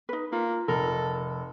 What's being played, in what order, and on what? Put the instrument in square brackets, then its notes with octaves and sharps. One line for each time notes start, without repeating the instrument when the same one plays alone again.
[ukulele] D#4 B4
[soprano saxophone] A#3 [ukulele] F4
[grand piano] F1 [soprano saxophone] A4 [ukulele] A#4